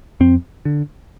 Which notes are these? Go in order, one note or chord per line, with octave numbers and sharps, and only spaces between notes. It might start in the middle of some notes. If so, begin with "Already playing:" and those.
F2 C4
D3